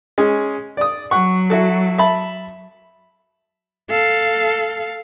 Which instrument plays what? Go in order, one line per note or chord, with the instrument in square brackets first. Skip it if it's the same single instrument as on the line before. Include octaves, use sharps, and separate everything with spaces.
[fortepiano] G#3 C#4 G#4
D5 D#6
[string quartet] F#3 [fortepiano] F#5 C#6
[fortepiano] E4 F#4 A4
E5 A5 B5
[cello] A4 F5